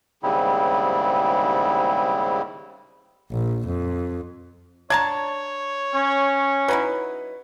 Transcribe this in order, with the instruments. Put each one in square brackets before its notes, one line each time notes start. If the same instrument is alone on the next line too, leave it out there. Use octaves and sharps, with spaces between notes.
[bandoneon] D#2 G#2 C#3 G3 C4 E4
[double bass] A#1
F2
[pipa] D4 A5 A#5 [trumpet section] C#5 [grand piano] G#6
[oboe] C#4
[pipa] F#3 D#4 E4 [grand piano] B4